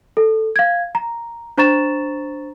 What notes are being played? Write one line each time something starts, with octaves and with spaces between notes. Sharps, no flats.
A4
F5 G#6
A#5
D4 C5 A#5 C#6 A6 E7